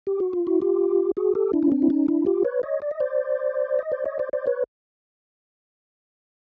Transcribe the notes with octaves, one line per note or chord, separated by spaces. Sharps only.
G4
F#4
F4
E4 F#4
F4 G4
F#4 G#4
G4 A4
D4 E4
C#4
C4 D4
E4
C#4 D#4
D4 E4
F4 G4
B4 C#5
C#5 D#5
D5
D#5
C5 D5
D#5
C5 D5
C#5 D#5
C5 D5
C5 D5
B4 C#5